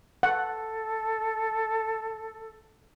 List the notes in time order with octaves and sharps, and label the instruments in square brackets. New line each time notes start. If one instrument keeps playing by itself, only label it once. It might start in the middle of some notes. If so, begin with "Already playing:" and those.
[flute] A4 [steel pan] F#5